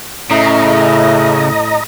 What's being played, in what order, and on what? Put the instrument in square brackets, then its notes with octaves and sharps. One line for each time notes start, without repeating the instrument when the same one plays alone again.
[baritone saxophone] A2 [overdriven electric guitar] C#3 [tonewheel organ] D#5 A#5 [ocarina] E5